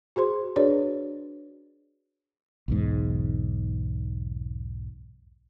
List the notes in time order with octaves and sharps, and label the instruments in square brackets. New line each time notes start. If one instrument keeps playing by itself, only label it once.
[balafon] F#4 G#4 C5 C6
D4 F#4 G#4 B4 C#5 D5
[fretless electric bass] B1 E2 G#2